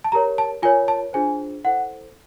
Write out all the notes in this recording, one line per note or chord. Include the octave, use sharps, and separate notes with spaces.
A5
G4 A#4 C#5 A#5
A5
F4 A#4 C#5 G#5
A5
D4 F4 G#4 C5 G#5
E4 A4 C5 F#5